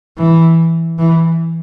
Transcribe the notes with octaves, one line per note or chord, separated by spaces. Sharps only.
E3
E3